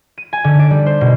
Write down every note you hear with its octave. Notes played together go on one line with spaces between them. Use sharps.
D#7
G#5
D3
D5
G3
C5
B2